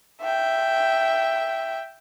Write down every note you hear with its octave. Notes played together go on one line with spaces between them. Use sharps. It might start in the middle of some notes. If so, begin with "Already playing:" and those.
E5 G5